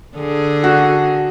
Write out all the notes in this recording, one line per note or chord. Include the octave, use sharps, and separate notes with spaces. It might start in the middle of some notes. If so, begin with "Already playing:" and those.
D3 G#4
F#4